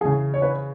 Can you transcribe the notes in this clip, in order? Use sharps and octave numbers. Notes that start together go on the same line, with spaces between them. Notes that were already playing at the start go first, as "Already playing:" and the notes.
C#3 E3 G#4
C#5
B4